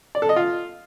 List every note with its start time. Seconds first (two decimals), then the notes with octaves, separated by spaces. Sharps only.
0.15 D5
0.22 A4
0.29 D#5
0.36 F4